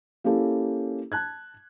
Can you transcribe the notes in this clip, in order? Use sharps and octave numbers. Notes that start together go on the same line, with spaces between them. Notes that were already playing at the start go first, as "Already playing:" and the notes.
A#3 C#4 E4 G4 A4
A5 F#6 G#6